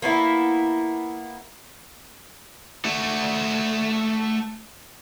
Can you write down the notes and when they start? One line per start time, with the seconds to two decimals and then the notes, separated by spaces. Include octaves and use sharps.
0.02 A#3 B3 E4
2.85 A3 F#4